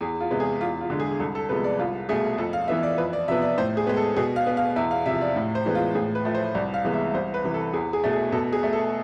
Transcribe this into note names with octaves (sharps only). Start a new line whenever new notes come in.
E2 G#4
F4
C3 G#3 B3
G#4
E2 F4
F4
D3 G#3
G#4
C2 A4
A4
C3 F3 G#3 B3 B4
D5
C2 F4
B2 A3 G#4
F2 A4
F5
E3 B3 E5
D5
F2 B4
D5
C3 F3 B3 E5
D5
A2 C5
G#4
G#3 B3
A4
B2 G#4
F5
B3
F5
E2 E5
F5
C3 F3 E5
D5
A2
C5
E3 G#3 B3
F4
A2 G#4
B4
F3 A3
C5
C2 D5
F5
C3 E3 G#3 B3
E5
C2 C5
B4
C3 E3
A4
E2 G#4
G#4
B2 A3
G#4
B2 A4
G#4
A3
A4